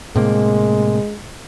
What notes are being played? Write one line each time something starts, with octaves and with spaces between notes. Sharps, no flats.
A2 C3 G#3 A#3